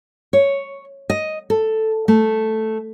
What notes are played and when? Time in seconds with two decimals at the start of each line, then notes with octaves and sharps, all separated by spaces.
0.33 C#5
1.10 D#5
1.50 A4
2.08 A3